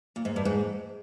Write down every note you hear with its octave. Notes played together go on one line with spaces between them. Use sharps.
A#2
G#2
G2
G#2